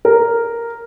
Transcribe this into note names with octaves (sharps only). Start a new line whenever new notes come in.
A#4